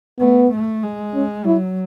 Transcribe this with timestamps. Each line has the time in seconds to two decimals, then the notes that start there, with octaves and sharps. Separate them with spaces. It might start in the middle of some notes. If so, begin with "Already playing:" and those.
0.19 A3 B3
0.51 A3
0.83 G#3
1.14 C#4
1.45 F#3 E4